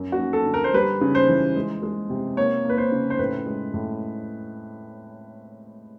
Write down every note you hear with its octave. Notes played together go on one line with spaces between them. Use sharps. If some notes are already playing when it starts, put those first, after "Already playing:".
Already playing: F#2
F#4
F#2
A4
D3
A#4
C5
G3 B4
C#3
C5
E3
G#3
G#3
C3
A#3 C#5
A#3 B4
C5
C#3
C5
A2 B4
G#3
A2